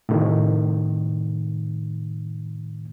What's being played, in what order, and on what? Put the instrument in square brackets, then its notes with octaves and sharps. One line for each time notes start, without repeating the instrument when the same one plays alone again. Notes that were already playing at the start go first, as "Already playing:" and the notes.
[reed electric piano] A2 C3 D#3 A3